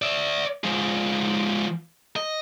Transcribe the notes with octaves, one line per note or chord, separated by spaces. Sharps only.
D5 E5
F3 G#3
D#5